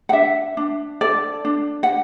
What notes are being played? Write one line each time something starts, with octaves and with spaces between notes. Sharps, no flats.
F#5
D4 E5
D4
A4 D5
D4
F#5